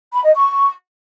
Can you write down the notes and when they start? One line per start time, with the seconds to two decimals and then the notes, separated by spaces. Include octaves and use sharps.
0.13 B5
0.24 D#5
0.35 C#6